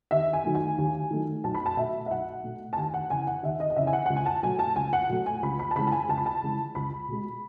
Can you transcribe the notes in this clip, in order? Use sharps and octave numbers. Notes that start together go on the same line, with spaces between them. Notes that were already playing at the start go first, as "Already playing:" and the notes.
D#2 E5
G#5
D#3 F#3 A3
G#5
D#2
D#3 F#3 A3
B1 A5
B5
A5
B2 A3 E5
E5
B1 F#5
B2 A3
A5
D#2 G#5
F#5
C#3 E3 G#5
F#5
D#2 E5
D#5
D#5
C#3 E3 E5
G#5
F#5
C#2 F#5
G#5
A5
B2 F#3 A3 G#5
A5
C#2 G#5
F#5
B2 F#3 A3
G#5
C#2 B5
B5
A5
C#3 E3 G#3 B5
A5
G#5
C#2 A5
B5
A5
C#3 E3 G#3
C#2 B5
B2 G#3